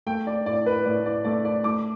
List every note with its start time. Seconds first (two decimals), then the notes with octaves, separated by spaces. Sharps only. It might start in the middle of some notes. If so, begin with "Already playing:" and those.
0.06 A3 G5
0.27 D5
0.46 A2 D5
0.66 B4
0.85 A2 D5
1.06 D5
1.25 A3 D5
1.45 D5
1.64 A3 D6